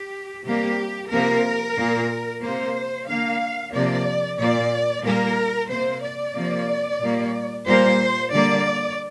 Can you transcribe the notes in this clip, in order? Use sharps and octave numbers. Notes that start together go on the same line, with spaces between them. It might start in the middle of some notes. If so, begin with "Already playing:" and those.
Already playing: G4
C3 G3 A#3 G4
C3 F3 A#3 A#4
A#2 A#3
C3 A#3 C5
D3 A#3 F5
C3 F3 A#3 D5
A#2 A#3 D5
A#2 G3 A#3 A#4
C3 A#3 C5
D5
C3 F3 A#3
A#2 G3 A#3
A#2 G3 A#3 C5
D3 G3 A#3 D5